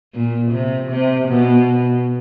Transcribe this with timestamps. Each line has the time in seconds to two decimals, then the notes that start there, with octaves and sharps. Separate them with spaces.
0.14 A#2
0.52 C3
0.90 C3
1.28 B2